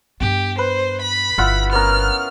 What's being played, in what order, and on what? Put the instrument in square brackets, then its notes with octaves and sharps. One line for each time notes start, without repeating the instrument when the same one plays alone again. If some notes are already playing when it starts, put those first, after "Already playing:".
[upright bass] G2 B3 [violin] G4
[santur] B4 [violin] C5
[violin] B5
[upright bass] G1 [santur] E4 F4 F#5
[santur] B3 C#4 A#4 [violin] F6